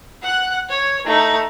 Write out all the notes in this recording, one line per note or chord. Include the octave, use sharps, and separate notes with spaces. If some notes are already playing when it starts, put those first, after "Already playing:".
F#5 F#6
C#5
A3 D#4